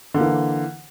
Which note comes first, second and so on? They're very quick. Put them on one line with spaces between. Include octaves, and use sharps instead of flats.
D3 A#3 E3